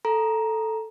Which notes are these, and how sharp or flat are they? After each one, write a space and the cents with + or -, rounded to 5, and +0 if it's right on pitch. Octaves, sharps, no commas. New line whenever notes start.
A4 +0 A#5 +10